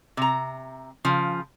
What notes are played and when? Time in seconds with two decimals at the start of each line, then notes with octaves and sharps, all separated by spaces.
0.17 C3 A#5
1.05 C#3 F3